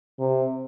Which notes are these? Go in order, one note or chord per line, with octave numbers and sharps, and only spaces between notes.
C3